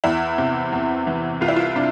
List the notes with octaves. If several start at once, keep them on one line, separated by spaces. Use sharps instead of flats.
E2 E4
C3
E2
E3
C2 F4
E4
F4
C3 D4